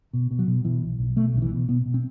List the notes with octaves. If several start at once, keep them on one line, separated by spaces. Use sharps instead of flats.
B2
B2
F#3
B2
B2 E3
B1
B1
B2 A3
B1 D3
E3
B2
B2 B3
B2
C4